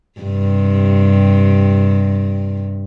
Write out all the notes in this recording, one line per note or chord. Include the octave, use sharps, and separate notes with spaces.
G2 C3